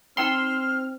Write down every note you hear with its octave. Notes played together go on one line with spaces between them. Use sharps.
C4 D#4 G5 B5 C6 E6 F6